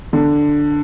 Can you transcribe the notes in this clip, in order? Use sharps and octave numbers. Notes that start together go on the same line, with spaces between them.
D3